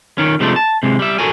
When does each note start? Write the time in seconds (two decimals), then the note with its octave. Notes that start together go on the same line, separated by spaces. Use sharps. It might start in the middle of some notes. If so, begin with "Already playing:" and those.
0.18 D#3 C#4
0.40 C3 F3 G#3 A3 C4 D4
0.56 A5
0.83 C3 G#3
0.99 G3 E5
1.19 F#4 A4 A#4 G#5